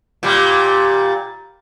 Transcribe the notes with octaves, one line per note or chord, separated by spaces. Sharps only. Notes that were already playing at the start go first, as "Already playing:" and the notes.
A#2 G3